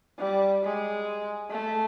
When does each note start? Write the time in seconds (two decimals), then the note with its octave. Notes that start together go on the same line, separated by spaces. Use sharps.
0.19 G3
0.63 G#3
1.50 A3